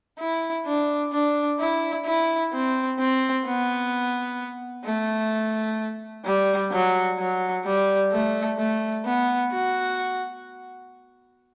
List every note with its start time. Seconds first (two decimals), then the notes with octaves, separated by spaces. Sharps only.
0.20 E4
0.66 D4
1.13 D4
1.60 E4
2.06 E4
2.53 C4
2.99 C4
3.46 B3
4.85 A3
6.25 G3
6.72 F#3
7.19 F#3
7.65 G3
8.12 A3
8.58 A3
9.05 B3
9.52 F#4